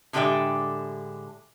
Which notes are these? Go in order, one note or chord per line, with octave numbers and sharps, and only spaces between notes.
A2 D3 G#3 G4 D5 E5